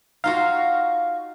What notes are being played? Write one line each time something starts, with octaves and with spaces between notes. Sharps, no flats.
D#4 F4 F#4 F5